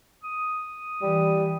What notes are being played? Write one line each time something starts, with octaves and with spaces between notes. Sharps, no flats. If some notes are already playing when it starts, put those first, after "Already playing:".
D#6
E3 G3